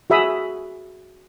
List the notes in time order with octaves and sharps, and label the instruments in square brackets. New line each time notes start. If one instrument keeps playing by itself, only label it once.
[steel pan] F#4 G#4 E5 B5 D#6